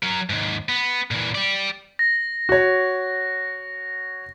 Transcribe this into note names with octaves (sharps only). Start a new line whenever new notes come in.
F#3 A#4
D#2 G#2
B3
A#2 E3
G4 D5
A#6
F#4 C#5